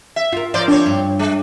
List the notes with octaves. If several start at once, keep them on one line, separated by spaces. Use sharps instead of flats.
E5
F4 A#4
F3 A#4 C5 D5
C4 D4 C#5
G2
G#3